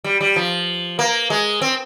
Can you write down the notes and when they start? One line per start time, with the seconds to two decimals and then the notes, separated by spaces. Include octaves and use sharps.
0.04 G3
0.21 G3
0.36 F3
0.99 A#3
1.30 G#3
1.61 C4